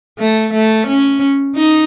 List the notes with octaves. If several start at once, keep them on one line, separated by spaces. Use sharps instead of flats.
A3
A3
C#4
D#4